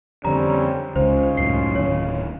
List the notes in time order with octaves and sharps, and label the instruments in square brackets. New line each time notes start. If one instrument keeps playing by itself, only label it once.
[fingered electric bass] F2 D3 [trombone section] G3 C4 C#4 [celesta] A#5
[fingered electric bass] C#2 C#3 [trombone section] C#4 D#4 F4 [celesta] C5
[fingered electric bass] C#2 F#2 A2 [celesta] C7
[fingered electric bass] D1 D#3 [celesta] C#5